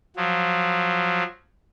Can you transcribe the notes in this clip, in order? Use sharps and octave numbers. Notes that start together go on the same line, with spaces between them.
F3 F#3